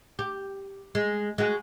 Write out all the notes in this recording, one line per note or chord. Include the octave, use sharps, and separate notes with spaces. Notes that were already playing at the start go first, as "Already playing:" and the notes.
G4
G#3
G#3 F#4